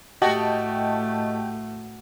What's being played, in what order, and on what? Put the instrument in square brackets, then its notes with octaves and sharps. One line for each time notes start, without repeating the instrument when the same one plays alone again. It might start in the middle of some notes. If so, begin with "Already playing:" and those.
[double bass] A2 A3 [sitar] F#4 [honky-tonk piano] G4 [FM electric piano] D#5 A5